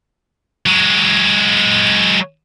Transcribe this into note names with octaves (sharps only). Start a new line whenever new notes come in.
F#3 G#3